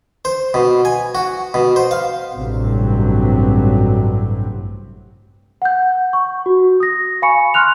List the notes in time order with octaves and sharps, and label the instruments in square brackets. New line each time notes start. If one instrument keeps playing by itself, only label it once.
[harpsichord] C5
B2
G#5
F#4
B2
C5
F5
[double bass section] A1 G2 C3 F#3
[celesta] F#5 G6
C#6
F#4
D#6 A#6
F5 G#5 B5 C#6 C#7
C6 F6 F#6 F7